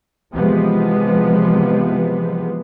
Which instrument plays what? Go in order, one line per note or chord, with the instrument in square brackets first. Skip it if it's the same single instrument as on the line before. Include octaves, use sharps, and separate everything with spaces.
[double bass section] C3 E3 F3 G#3 B3